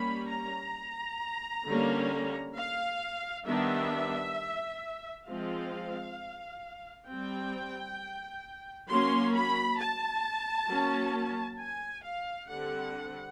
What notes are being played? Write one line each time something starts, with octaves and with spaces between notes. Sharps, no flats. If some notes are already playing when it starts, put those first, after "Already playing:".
Already playing: G3 A#3 C#4 B5
A#5
D3 G3 A#3 C#4
F5
D#3 G3 B3 D4 E5
F3 G#3 C4 F5
G3 C4 G5
F#3 A#3 C#4 C6
B5
A5
F#3 A#3 C#4
G#5
F5
D3 G3 C4 F#5